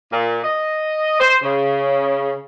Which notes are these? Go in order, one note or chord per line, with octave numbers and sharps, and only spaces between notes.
A#2
D#5
C5
C#3